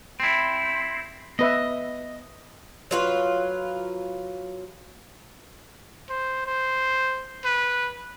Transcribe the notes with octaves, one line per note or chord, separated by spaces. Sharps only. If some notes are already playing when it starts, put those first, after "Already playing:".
C4 E4
B3 B4 D#5 E5
F#3 F4 B4
C5
C5
B4